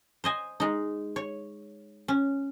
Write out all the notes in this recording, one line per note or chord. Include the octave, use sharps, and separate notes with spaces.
C5 D#5 G#5
G#3 D#4
C#5
C#4